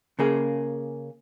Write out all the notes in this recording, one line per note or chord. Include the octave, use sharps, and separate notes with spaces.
C#3 A#3 G#4